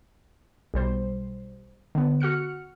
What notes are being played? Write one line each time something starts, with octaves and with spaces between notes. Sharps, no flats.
B1 G3 C5
D3 B3
F#4 F#5 F6 C#7